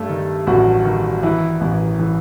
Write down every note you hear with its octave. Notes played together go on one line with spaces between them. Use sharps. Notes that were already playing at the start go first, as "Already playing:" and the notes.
Already playing: G2 A3 A4
D#3
A1 F#3 F#4
D#3
E3 E4
A1
E3